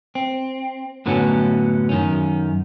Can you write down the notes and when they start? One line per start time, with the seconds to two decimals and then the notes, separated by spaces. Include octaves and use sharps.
0.15 C4
1.06 F#2 A2 D3 F#3 B3 C#4
1.89 F#2 D#3 C#4